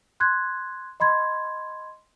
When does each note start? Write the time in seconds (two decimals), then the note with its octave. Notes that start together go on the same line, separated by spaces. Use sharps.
0.20 C6 F#6 G#6
1.00 D#5 B5 C6 G#6